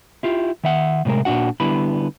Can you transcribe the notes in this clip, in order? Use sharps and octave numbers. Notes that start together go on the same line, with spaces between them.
E4 F4 G4
D#3 E5 F#5
A2 C3 F#3 G#3 A#4
A#2 C#3 D4 F#4 F#5
D3 G3 B3 E4 B5